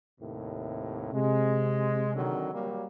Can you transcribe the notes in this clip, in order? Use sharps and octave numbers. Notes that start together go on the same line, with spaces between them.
D#2 A2 C3
C3 G#3
D3 D#3 F#3
F#3 G3 A#3